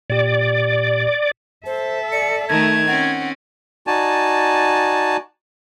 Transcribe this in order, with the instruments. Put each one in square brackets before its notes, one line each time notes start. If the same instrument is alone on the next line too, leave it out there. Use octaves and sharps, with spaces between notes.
[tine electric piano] A#2 G4 [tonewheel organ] D5
[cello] A4 E5 [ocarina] C5
[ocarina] D5 [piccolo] C#7
[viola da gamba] D#3 A3 D#4 [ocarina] A5 [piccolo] G#6
[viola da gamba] C4 C#4 [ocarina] F#5
[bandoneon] D#4 F#4 D5 G#5 A5